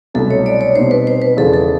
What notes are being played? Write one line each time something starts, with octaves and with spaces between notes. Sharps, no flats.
C2 B2 F#3 A3 A4
C#5
D5
C#5
B2 G3 C4 D#4 C5
B4
C5
B4
E2 C#3 F3 G#3 B3 A4
A4